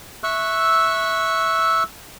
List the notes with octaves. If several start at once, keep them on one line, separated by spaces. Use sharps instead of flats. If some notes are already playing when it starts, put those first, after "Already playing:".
E5 C#6 E6 F#6